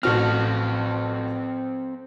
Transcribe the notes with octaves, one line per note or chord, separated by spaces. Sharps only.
A1 C4 F#4 A4 F6